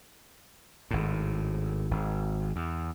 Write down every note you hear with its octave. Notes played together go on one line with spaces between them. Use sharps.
G#1 A2
G#1
E2